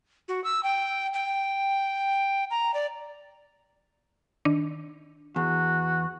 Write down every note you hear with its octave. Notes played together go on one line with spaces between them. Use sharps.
F#4
E6
G5
G5
A#5
D5
D#3 D4
E2 F#4